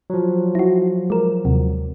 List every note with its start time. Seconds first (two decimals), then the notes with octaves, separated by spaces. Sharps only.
0.10 F3 F#3
0.55 E4 F#4
1.10 G#3 A#4
1.45 D#2 C3